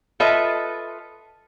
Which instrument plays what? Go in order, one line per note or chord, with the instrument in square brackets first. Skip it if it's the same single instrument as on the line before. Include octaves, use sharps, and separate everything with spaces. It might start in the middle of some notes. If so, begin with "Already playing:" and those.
[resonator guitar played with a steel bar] F4 A4 B4 D#5 E5